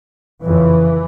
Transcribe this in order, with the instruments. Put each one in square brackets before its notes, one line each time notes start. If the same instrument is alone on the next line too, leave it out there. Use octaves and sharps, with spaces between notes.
[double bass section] F2 C#3 E3